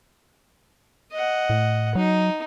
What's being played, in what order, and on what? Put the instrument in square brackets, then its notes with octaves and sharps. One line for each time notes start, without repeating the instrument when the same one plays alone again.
[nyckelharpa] D#5 F#5
[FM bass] A2
[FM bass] F#3 [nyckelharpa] D#4